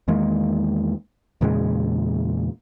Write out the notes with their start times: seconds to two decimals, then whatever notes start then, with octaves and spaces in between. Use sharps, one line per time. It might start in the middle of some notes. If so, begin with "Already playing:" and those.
0.08 E2 D#3 G#3 A#3
1.41 E2 A#2 C#3 G#3